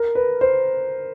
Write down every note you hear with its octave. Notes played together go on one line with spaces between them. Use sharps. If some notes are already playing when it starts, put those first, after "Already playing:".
Already playing: A#4
B4
C5